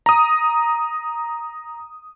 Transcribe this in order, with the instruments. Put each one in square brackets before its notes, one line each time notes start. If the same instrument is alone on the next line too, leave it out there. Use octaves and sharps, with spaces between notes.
[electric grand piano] A#5 D#6